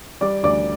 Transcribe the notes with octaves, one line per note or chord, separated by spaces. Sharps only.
G3 D5 D6
D2 D5 D6